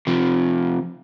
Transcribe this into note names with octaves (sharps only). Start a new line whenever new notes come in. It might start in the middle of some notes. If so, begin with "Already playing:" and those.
C3 F3